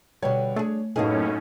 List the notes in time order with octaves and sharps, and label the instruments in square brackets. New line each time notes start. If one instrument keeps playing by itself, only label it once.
[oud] B2 D3 G3 [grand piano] C#5
[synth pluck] A3 [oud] D4 G#4
[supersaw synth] F#2 A2 C#4 [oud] A#3 B3 G#4 [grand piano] D#4 A4